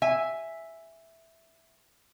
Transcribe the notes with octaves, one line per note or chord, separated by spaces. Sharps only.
E5 G#5